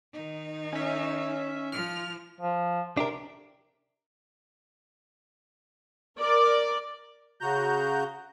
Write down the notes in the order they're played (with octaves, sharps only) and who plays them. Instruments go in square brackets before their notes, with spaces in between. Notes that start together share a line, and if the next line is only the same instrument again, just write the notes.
[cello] D#3 D#4
[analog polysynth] C#4 E5
[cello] F3 [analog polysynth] F6
[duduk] F3
[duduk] C3 [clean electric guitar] D4 G4 A#4
[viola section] A#4 D5
[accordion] C#3 F#4 A#5 G6